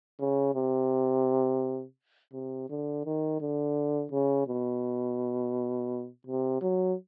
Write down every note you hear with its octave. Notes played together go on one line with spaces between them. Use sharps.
C#3
C3
C3
D3
D#3
D3
C#3
B2
C3
F#3